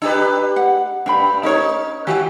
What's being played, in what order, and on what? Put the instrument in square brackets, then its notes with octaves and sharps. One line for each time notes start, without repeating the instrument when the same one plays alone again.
[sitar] D4 G4 B4
[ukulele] F#5
[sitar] G2 [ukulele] D4 G5 B5
[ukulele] C#4 A#4 C#5 [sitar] D#4
[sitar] D#3 [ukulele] F#4 G4